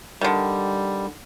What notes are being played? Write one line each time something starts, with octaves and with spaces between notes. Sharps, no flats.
D3 D#3 G3